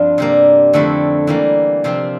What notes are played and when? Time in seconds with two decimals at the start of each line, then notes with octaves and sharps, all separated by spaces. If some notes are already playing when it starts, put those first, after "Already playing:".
Already playing: G2 F3 C4 D4 F4
0.18 C3 G3 A#3
0.73 F2 D3 A3 C4 E4
1.27 E3 G3 A#3
1.84 C3 F3 C4 F4